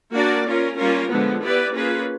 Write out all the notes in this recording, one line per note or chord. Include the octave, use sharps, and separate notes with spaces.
A#3 D4 F#4 A#4 D5
C#4 F4 A#4
G3 A#3 C#4 F4 A#4
D3 F3 G#3 B3
B3 E4 G4 B4 D5
A#3 C#4 F4 G#4 B4